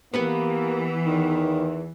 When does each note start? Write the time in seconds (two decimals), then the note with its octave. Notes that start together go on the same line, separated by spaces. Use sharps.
0.14 E3 A#3 B3 G4 B4 F#5
1.06 E2 D#3